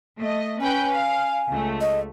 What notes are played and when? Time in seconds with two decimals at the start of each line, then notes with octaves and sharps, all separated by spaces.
0.18 A3 D#5
0.60 C#4 B4 G5 G#5
0.92 F5
1.49 C#2 A3
1.81 D#5